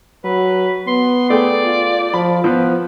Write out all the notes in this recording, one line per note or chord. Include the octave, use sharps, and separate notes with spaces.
F#3 B4
B3 C6
A3 G#4 D5 G5
F4
F3 B5
F3 B3 B4